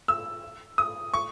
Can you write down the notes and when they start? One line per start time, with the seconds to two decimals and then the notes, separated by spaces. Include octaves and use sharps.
0.08 E6
0.78 D#6
1.14 C#6